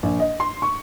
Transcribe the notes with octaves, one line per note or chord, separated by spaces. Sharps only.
A#1
D#5
C6
C#6